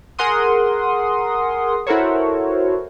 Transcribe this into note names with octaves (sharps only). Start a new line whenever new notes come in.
G#4 A#4 F#5 C6 D#6
E4 F#4 A4 A#4 C5 C#5